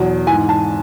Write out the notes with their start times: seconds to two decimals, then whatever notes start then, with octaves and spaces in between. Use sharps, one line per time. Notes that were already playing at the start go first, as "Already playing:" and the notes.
Already playing: E2 B2 F#3
0.27 E3 G#5
0.32 G#2
0.49 A5